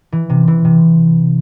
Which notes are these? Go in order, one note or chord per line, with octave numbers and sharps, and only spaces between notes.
E3
C3
E3
C3